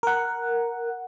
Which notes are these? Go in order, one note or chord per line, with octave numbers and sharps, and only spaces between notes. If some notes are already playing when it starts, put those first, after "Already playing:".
A#4 F#5